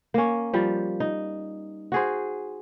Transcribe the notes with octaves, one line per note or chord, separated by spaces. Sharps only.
A#3 C#4
F3 G3
D#4
F#4 G#4 C5